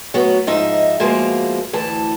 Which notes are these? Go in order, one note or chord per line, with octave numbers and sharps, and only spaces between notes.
F#3 B3
G#2 F3 D#4 E5
B2 F3 G#3 A#3
D2 E3 A5